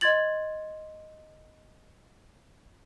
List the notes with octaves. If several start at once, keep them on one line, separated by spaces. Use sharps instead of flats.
D#5 C6 G#6 A6 F#7